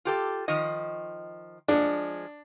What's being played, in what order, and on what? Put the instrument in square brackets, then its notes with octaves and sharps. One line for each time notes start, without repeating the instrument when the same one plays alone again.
[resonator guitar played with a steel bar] F4 G4 A4
D#3 F3 D#5
[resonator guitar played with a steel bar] F3 G#3 [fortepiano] D4